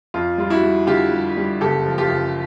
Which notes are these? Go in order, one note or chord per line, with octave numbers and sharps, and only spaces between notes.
F2 F4
G3 F4
E4 F#4
G3
D3 F4 G4
G3
G3
F#1 G4 A4
F3
F4 G4
F#1